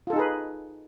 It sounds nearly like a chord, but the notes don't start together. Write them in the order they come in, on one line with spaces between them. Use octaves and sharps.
F4 A4 D#4 G#4 B4